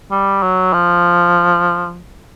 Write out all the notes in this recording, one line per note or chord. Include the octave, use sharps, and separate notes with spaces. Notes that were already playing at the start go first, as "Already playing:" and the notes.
G3
F#3
F3